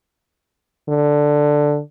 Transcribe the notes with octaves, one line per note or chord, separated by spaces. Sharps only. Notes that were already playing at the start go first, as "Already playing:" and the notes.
D3